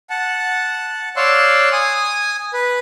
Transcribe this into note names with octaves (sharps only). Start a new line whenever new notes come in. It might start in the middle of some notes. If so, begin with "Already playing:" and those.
F#5 A5
C#5 D5 F5 C6 E6 F#6
G#5 D#6
B4